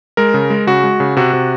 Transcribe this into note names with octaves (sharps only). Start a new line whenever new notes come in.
G#3 A#4
C#3
G#3
C#3 F#4
G#3
C#3
C3 F#4
C3